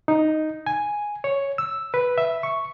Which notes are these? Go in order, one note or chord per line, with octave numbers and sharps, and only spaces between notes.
D#4
G#5
C#5
E6
B4
E5
C#6